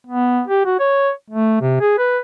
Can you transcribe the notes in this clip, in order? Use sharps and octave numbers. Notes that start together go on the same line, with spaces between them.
B3
G4
F#4
C#5
A3
C3
G#4
B4